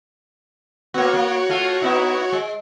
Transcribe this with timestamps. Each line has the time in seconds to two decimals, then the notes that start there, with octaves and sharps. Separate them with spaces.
0.94 A#3 B3 F#4 C#5
1.14 A#3
1.49 A3 F4 A4
1.82 B3 D#4 E4
2.32 G#3